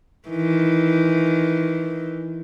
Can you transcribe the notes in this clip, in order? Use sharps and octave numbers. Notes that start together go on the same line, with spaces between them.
D#3 E3